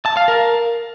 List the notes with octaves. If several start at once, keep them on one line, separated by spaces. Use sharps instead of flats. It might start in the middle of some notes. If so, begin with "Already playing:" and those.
A5
F5
A#4